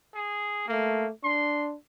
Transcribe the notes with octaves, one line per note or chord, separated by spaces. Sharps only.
G#4
A3 A#3
D4 C6